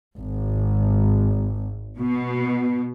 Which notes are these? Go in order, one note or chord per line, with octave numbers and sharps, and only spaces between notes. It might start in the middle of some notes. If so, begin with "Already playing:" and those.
G#1
B2